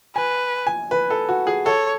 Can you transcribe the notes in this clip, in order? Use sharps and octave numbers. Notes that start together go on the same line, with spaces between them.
B4 G#5
G#5
B4
A4
F#4
G#4
A4 C#5